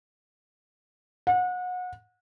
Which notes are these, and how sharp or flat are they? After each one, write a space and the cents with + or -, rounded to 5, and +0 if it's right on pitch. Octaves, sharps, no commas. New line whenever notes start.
F#5 -30